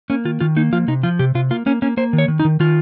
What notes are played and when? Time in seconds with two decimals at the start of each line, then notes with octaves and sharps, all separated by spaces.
0.10 A#3 C#4
0.25 D#3 F4
0.40 D#3 F4
0.56 A#3 D#4
0.72 F3 F4
0.88 C3 D#4
1.03 F3 F4
1.19 C3 G4
1.35 C3 F4
1.51 A#3 F4
1.66 A#3 C#4
1.82 A#3 C#4
1.97 A#3 C5
2.13 D#3
2.18 C#5
2.28 D#3
2.40 D#4
2.45 D#3
2.60 D#3 F4